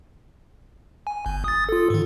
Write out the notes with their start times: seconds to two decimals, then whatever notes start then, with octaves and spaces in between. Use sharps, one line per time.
1.07 G#5
1.26 G1
1.44 D#6 A6
1.69 F4 A4
1.90 G#2 D#3